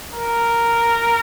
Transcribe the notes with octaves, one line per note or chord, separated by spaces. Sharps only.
A#4